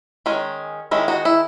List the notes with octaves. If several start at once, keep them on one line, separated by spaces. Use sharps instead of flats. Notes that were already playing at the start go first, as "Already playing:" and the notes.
D#3 G#3 C#4
D#3 G#3 C#4 E4
D#4 F#4
E4